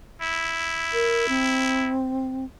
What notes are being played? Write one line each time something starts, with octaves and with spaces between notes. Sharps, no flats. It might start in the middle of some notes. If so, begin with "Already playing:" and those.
E4
A#4
C4